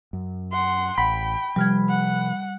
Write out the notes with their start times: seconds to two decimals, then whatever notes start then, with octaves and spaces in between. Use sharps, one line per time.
0.13 F#2
0.52 F#5 C6
0.98 A1 F#5 G5 B5
1.56 C3 F3 G3 F6 G#6
1.89 F#5